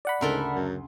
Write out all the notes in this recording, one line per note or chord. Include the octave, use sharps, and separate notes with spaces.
D5 F#5 B5
D2 G#2 C#3 A4 A#4 E5 C6
F#2